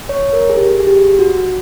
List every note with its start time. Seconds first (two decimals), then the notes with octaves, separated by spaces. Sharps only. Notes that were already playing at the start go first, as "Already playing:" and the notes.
0.09 C#5
0.33 A#4
0.49 G#4
0.57 G4
0.80 G#4
0.87 G4
1.19 F#4